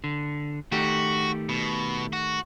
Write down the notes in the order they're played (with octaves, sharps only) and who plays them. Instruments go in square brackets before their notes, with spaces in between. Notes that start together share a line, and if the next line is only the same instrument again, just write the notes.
[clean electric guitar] D3
[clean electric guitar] D#3 A3 G4 [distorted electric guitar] F#4
[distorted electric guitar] B2
F#4